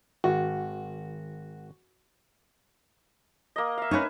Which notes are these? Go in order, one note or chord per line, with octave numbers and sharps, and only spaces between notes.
G#1 F#4
A#3 D#5
E5 F5
C#4 D#4 B4 G#5 C#6